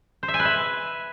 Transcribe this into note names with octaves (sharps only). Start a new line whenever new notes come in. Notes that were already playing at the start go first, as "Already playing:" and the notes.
C5
E5
G#5
B4
E5